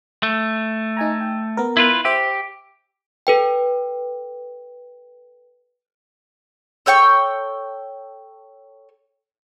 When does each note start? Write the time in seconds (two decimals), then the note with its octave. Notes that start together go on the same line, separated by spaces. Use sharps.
0.23 A3
0.97 D#4 G#5 A#5
1.21 G5
1.57 B3 A#4
1.77 E4 F4 B4
2.05 G4 C5 E5
3.27 A4 B4 G5
6.86 A4 C#5 G5 C#6